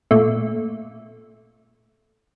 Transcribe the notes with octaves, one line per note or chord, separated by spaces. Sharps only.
A#2 A3